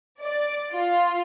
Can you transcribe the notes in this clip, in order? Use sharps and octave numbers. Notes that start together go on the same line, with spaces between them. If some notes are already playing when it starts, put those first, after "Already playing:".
D5
F4